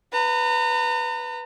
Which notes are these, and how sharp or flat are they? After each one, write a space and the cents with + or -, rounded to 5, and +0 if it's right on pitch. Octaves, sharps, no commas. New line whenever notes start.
B4 +0 A#5 -35